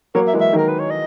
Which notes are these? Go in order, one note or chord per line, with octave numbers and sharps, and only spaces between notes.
F#3 A#3 C#5
E5
E3 G#3
E5
D#3 F#3 A#4
B4
C#5
D#5